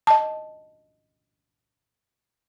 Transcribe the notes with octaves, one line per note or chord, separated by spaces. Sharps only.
D#5 A5